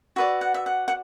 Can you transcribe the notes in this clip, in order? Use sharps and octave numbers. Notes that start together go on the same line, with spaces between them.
F#4 B4 D5 E5
F#5
E5
F#5
F#5